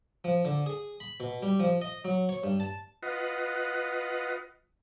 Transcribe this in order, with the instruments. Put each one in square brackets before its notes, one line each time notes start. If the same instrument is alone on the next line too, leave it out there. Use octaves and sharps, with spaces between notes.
[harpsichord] F3
D3
G#4
B5
B2
G3
F3
D#5
F#3
C#5
G2
A5
[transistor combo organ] F4 B4 D#5 F#5